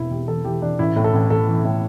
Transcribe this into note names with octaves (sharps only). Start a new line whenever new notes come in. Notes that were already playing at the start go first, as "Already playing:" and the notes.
Already playing: E1 E3 E4
E1 G4
E3 A4
E3 G4
E3 D4
A1 E4
A2
A4
A1
A1 A4
E3
A2